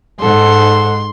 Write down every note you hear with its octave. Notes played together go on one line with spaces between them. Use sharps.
G#2 A4 F#5 C6